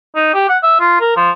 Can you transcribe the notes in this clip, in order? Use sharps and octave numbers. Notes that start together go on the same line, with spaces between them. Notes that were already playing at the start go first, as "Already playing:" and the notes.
D#4
G4
F#5
E5
F4
A#4
F3